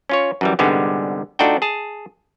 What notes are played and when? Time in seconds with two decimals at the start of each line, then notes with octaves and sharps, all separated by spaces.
0.09 C#4 F4 C#5
0.41 F#2 E3 G3
0.59 C2 G#2 D3 G3 G#3 B3
1.39 A3 D4 D#4 F4 F#4 G5
1.62 G#4 A5